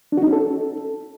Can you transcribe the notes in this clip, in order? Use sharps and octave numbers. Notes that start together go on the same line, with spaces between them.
D4
F#4
D#4
C#4
A4